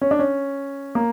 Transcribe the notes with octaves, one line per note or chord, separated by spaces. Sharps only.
C#4
D4
C#4
A#3